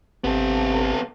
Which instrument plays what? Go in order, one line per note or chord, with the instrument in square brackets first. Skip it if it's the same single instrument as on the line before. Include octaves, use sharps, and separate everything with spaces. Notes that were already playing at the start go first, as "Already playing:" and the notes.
[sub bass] G#1 [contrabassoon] C3 [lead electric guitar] B3 A4